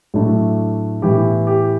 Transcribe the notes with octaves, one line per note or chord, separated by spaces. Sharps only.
A2 F#3 A3 D4
A2 E3 B3 G4
G4